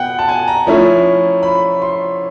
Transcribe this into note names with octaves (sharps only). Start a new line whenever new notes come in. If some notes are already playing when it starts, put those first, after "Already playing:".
Already playing: B2 B3 F#5 G5
A5
G#5
A#5
F3 A3 C#4 E4
B5
C6